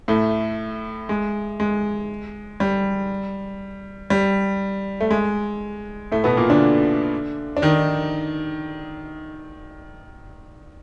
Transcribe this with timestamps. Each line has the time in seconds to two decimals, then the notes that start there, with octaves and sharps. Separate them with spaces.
0.08 A2 A3
1.09 G#3
1.60 G#3
2.60 G3
4.10 G3
5.01 A3
5.11 G#3
6.12 A2 A3
6.24 B2 B3
6.37 A#2 A#3
6.50 D3 D4
7.57 D4
7.62 D#3 D#4